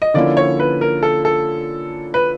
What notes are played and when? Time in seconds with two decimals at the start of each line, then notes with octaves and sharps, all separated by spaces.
0.02 D#5
0.14 D3 F3 A#3 C#4 E4 D5
0.37 C#5
0.60 B4
0.81 A#4
1.03 A4
1.25 A4
2.14 B4